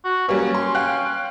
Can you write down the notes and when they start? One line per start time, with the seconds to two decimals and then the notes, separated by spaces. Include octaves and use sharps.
0.05 F#4
0.29 F#3 G3 A#3 C#4
0.55 C6
0.75 F5 G5 F#6